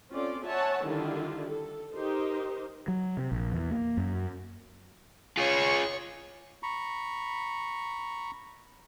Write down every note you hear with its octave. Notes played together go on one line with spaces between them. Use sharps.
C4 C#4 F4 A4 D5
C#5 E5 F#5 G#5 A5
D3 D#3 G3 D4 E4 F4
A4
D#4 G4 A#4 C5
F#3
C3
A#1
E2
A#3
F#2
F4 G#4 C#5 C#6
A#5 B5 C#6